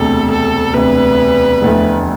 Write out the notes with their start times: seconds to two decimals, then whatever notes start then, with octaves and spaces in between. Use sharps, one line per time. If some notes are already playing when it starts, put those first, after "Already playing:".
Already playing: E1 D2 C3 A4
0.31 A4
0.74 E1 D2 C3 B4
1.62 F1 E2 D3 A3